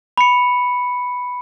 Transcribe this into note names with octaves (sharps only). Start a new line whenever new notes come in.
B5 C#7